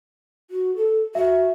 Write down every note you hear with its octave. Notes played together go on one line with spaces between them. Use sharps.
F#4
A4
F#4 E5